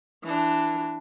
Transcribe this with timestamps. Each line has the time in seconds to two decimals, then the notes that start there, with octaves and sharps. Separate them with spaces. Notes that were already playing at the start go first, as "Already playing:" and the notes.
0.24 E3 D4